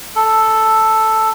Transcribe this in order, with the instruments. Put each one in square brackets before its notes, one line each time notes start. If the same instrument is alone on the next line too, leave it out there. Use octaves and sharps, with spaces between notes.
[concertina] A4